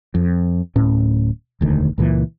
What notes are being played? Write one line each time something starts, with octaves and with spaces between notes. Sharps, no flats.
F2
D1 A2 C#4
E1 D2 D#3
C#2 A#2 E3